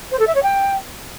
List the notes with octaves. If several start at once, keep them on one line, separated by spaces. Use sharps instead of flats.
C5
A4
E5
C#5
G5